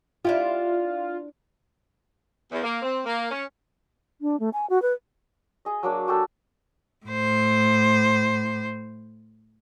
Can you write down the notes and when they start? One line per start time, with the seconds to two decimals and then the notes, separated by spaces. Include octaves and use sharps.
0.25 D4 E4 F4 G4
2.52 E2
2.63 A#3
2.82 C4
3.05 A#3
3.31 C#4
4.21 D4
4.40 A3
4.53 G#5
4.70 F#4
4.82 B4
5.65 G#4 D#5
5.83 F#3 A#3 D4
6.08 F#4 G4 A4 F5
7.06 A2 C5